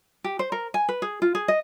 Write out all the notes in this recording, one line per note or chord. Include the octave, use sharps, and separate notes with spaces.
G4
C5
A#4
G#5
B4
G#4
F4
G#4
D#5